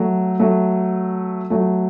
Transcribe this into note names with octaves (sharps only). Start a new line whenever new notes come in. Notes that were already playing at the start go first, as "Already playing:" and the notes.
Already playing: F#3 A3
F#3 A3
F#3 A3